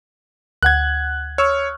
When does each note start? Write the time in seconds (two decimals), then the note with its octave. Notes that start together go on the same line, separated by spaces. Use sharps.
0.63 D2 F#5 F#6 G#6
1.38 C#5 C#6 E6 F6